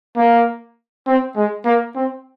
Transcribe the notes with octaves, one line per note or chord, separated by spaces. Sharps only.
A#3
C4
G#3
A#3
C4